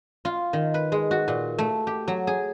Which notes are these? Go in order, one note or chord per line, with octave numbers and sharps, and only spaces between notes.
F4
D#3
B4
G#3
F#4
A#2
A3
G4
F#3
G#4